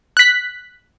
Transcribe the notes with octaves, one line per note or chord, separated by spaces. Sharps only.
F#6 B6